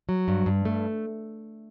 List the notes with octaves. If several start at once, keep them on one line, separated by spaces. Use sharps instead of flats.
F#3
G2
G2
A3